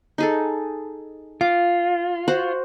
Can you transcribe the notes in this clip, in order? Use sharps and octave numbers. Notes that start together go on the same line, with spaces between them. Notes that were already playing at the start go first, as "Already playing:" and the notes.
D#4 G#4 A4
F4 D6
F#4 C5 F#5